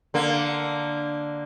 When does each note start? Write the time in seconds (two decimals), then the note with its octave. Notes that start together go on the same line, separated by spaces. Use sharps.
0.14 D3 A#3